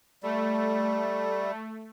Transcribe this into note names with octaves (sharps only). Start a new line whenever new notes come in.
G3 A3